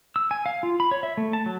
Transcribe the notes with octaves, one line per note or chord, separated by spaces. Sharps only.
E6
G#5
F5
F4
B5
C#5
E5
A3
A5
F#3